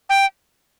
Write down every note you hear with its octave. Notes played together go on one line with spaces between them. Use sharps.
G5